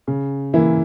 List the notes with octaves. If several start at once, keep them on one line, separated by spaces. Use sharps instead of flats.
C#3
E3 A#3 E4